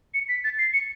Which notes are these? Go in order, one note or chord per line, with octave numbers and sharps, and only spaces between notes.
C#7
B6
A6
C7
C#7